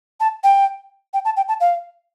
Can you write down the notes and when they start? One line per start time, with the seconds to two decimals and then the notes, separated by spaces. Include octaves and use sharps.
0.20 A5
0.44 G5
1.14 G5
1.25 A5
1.37 G5
1.48 A5
1.61 F5